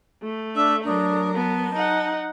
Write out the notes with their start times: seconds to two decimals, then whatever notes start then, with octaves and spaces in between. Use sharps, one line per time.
0.23 A3
0.56 D4 E5 E6
0.85 F#3 D4 A#4 D#6
1.34 B3 A5
1.75 D#4 F#5